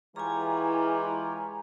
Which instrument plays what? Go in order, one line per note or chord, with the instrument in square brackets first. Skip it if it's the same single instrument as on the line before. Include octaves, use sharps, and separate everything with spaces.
[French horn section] E3 G#3 E4 [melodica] F4 G4 C#5 [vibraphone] G#5 A#5